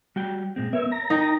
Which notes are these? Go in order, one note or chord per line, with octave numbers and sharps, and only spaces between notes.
G3 F#4 G5
A#2 G#3 C4
B3 A#4 C#5 E5
A#5
D#4 A#4 D#5 G5